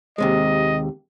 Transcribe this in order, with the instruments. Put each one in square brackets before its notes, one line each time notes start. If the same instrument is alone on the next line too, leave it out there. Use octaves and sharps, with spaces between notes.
[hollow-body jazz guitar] D#2 C3 G#3 [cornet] D#5